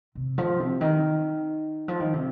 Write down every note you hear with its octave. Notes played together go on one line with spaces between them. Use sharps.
C3
F3
C3
D#3
F3
D#3
C3